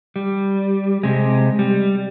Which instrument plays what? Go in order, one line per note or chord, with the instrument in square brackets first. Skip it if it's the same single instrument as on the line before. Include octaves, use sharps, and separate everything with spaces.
[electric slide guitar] G3
C3 G#3
G3